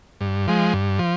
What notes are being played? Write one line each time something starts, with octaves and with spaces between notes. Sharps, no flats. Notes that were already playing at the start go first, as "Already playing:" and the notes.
G2
F3 G#3
G2
F3